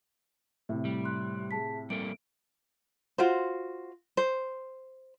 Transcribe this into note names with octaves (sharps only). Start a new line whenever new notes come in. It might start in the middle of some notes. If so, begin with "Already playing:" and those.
A2 C3
G3
C6 F#6
G#4 A5 B6
G3 A#3 A4 D7
F4 F#4 C5
C5